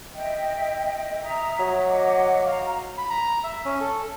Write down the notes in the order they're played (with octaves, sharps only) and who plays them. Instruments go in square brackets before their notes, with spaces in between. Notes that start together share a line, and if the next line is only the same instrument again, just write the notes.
[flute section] D#5 E5 G5
E5 A#5 D#6
[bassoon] F#3
[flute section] D#5 F#5 D6
F5 A#5
[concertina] B5
A#5
E5
C#4
A4